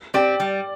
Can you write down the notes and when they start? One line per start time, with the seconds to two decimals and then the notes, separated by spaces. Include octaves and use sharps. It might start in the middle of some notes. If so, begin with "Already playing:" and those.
0.14 C4 G4 D5
0.40 G3